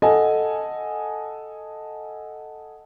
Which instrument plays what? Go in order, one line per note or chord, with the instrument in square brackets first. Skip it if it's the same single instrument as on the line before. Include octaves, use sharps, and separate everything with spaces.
[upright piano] A4 D#5 F#5 G#5